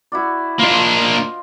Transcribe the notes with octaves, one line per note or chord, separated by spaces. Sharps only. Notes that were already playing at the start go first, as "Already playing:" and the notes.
E4 F#4 D5
A#3 D4 F4 C5 D#5